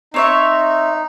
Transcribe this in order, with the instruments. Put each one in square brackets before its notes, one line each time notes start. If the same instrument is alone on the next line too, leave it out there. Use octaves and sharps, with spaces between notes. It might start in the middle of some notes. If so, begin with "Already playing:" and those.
[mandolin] C4 C#5 E5 [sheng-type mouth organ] D#4